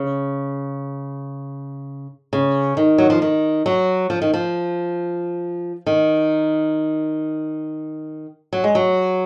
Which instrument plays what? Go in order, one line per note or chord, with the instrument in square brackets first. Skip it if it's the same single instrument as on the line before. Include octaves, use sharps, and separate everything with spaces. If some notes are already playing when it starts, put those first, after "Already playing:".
Already playing: [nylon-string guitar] C#3
C#3
D#3
F#3
F3
D#3
F#3
F3
D#3
F3
D#3
F#3
G#3
F#3